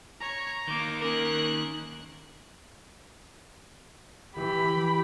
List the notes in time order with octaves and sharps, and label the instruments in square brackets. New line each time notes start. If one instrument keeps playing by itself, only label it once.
[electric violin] C#5 [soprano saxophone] A#5
[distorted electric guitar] D#3 A#3 [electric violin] D6
[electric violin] C#4 F#6 [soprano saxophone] A#4
[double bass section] E3 [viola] G4 B5